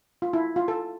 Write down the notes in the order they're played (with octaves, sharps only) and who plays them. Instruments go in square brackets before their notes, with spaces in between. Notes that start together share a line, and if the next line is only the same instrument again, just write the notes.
[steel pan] F4
E4
F4
A4